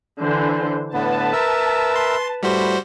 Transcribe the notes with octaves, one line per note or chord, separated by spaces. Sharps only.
D3 E3 C5
A2 D3 B3 B4 A5
A#4 E5 E6
C6
A2 G3 F#4 C5 B5